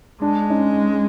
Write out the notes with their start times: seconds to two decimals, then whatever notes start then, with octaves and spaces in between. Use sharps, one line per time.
0.21 G#3 D4
0.50 C#4 D#4